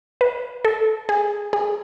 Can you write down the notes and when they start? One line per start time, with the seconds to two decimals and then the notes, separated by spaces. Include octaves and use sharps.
0.21 B4
0.65 A4
1.09 G#4
1.53 G#4